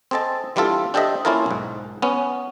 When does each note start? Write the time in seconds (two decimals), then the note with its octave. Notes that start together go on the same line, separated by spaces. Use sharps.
0.11 C4 G#4 A4 D#5 A5
0.56 E3 G3 D4 F4 A4
0.94 D4 G4 A4 C5 D#5 E5
1.25 A#3 C#4 E4 F4 A4 A#4
1.46 B1 G#2
2.02 B3 C#4